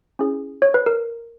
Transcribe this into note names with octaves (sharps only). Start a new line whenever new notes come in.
C#4 E4 G#4
C#5
B4
A#4